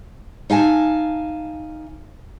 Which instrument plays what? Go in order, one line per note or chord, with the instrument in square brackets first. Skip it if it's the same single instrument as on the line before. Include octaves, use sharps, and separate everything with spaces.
[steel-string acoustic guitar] D#4 F5 G#5 A5